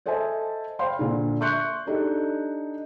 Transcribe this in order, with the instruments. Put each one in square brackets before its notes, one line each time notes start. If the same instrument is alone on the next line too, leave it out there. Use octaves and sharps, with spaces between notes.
[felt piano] A4 C5 D#5 E5 G#5 A5
C5 F5 G5 B5 C6
A#2 D3
E5 C6 C#6 F#6 G6 C#7
D4 D#4 G4 A4